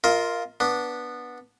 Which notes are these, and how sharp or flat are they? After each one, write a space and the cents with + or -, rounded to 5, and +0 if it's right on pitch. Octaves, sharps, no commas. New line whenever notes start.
F4 +0 A#4 +0 D#5 +45
B3 -10 D4 +0